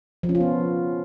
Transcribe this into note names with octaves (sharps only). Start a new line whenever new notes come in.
F3
C#4
F4
B3